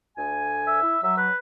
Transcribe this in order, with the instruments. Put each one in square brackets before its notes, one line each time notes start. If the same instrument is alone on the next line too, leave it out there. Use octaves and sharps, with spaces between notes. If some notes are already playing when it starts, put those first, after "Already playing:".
[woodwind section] D2 G#5
[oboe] E5
[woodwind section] E4
[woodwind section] F#3 [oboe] E5
[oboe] B4